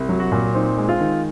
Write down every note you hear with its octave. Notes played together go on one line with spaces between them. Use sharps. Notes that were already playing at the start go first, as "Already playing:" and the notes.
Already playing: C2
F#3
F#4
A#2
C4 D#4
G#3
F4
D#3